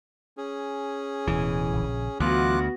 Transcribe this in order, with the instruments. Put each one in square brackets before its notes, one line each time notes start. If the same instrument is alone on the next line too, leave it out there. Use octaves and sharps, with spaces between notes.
[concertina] C#4 G#4
[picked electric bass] D1 E3 [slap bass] B2
[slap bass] A#1 C#3
[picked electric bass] D2 [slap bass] E3 F#3 [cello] B3 F#4 [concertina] F4 D6 F#6